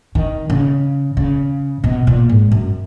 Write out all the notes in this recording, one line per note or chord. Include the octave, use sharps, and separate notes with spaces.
D#3
C#3
C#3
B2
A#2
G#2
F#2